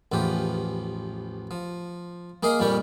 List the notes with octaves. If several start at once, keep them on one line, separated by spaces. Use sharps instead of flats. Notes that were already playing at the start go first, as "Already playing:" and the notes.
A1 E2 F3 G4
F3
A#3 G#4 A#4 D#5 F5
F2 A#2 G3 G4 C#6